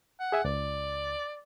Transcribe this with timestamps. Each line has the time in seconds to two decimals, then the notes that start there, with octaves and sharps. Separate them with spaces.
0.20 F#5
0.32 G#4 E5 G#5
0.45 C#2 D5